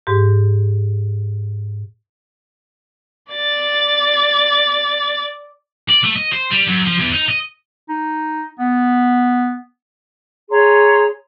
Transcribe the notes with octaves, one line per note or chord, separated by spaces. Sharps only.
G#2 G4
D5 A6
D5
A3
D#5
C5
G3
F#2
F3
E2
D#4
D#5
D#4
B3
G#4 C#5 A#5 C6